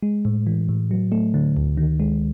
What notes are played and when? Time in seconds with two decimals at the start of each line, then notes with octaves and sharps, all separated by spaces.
0.03 G#3
0.25 A2
0.47 E3
0.69 A2
0.91 F#3
1.12 A3
1.34 D3
1.57 D2
1.77 D#3
2.00 G#3